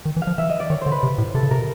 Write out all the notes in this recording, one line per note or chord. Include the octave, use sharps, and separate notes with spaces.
D#3
E3
F5
F3
E3 E5
D#5
D5
D#3 C#5
D3 C5
B4
C3
A2
C3 A4
C#3
C3 A#4
B2